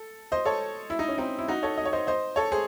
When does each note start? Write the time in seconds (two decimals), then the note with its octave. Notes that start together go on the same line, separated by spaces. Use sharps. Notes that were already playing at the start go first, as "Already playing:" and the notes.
Already playing: A4
0.32 C5 D#5
0.45 A4 C#5
0.90 E4
0.99 D#4
1.08 C#4
1.18 C4 D#4
1.39 E4
1.48 D#4 F#4
1.63 A4 C#5
1.78 D#5
1.85 C#5
1.93 C5 D#5
2.07 C5 D#5
2.36 A4 C#5
2.52 G#4 C5